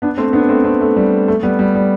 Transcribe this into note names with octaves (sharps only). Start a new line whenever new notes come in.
B3 D4
A3 C4
B3 D4
A3 C4
A3 C4
A3
G3
A3
G3 B3
G3
G3